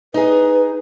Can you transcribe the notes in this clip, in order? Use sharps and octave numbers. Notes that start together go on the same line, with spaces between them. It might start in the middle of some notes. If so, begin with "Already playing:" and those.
D#4 G#4 B4